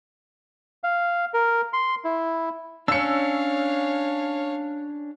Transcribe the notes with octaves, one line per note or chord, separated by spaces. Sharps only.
F5
A#4
C6
E4
C#4 D4 C#5 F5 E6 C#7